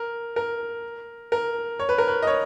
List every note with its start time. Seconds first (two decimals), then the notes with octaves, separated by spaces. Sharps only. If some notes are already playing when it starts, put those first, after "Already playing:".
Already playing: A#4
0.36 A#4
1.32 A#4
1.80 C#5
1.89 B4
1.98 A#4
2.07 B4
2.22 D#5
2.27 C#5